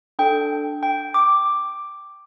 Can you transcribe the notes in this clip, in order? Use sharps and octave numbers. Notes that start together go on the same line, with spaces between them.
D4 A4 G5
G5
D6